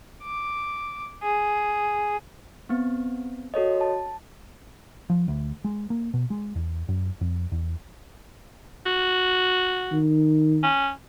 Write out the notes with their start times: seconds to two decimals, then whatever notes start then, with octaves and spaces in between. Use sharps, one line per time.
0.24 D6
1.23 G#4
2.69 B3 C4
3.54 F#4 A4 C#5 D#5
3.81 A5
5.10 F3
5.28 D2
5.64 G#3
5.90 A#3
6.14 B2
6.30 G#3
6.55 E2
6.88 F#2
7.21 F2
7.52 E2
8.86 F#4
9.92 D#3
10.63 C#4